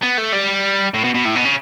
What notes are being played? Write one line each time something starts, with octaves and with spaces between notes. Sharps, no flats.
B3
A3
G3
A2
B2
B2
A2
B2
C#3